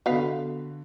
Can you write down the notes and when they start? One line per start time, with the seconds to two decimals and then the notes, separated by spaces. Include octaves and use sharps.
0.06 D3 B3 F#4 B4 F5